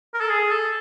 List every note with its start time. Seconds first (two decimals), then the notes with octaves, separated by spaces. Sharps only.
0.14 A#4
0.21 A4
0.29 G#4
0.51 A4